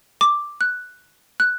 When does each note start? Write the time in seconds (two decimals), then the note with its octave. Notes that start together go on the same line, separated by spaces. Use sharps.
0.21 D6
0.61 F#6
1.40 F#6